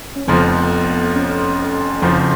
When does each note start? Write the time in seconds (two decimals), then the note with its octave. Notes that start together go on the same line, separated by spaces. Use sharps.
0.15 C#4
0.27 F1 F2 F3 B3
1.15 C#4
2.02 F#1 F2 F3